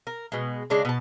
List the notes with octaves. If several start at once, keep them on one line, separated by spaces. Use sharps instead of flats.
A#4
B2 G#3
C#3 G#3 D4
B2 A5